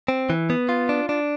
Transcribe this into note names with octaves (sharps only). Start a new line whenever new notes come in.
C4
E3
B3
F4
D4
D4